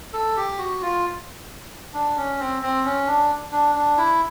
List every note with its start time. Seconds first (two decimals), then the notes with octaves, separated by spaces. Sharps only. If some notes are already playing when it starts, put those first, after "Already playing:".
0.13 A4
0.36 G4
0.58 F#4
0.82 F4
1.94 D4
2.17 C#4
2.40 C4
2.63 C4
2.84 C#4
3.07 D4
3.52 D4
3.75 D4
3.97 E4